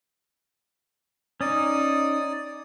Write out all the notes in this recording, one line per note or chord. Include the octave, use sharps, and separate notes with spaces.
C#4 D#4 D5 D#6